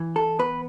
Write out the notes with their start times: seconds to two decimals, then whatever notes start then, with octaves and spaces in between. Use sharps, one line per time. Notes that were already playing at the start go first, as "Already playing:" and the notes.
Already playing: E3
0.16 A4
0.39 B3 B4